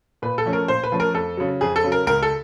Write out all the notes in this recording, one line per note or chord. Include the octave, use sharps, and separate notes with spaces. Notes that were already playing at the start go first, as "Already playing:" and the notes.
A#2 B4
A4
F3 A3 C#4
A#4
A#2 C5
B4
F3 A3 C#4
A#4
F2 A4
C#3 F#3
F2 G#4
A4
C#3 F#3
A#4
C#2 A#4
A4